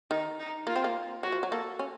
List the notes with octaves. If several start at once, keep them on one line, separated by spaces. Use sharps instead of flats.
D#3 D#4
D#4
A#3 F4
C4
A#3
F#3 F#4
F3
F#3
A#3 A4
C#4